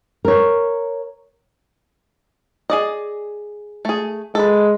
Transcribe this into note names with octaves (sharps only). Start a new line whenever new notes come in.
A#4 C#5
G#4 D5 D#5
A3 G#4
G#3 A4 B4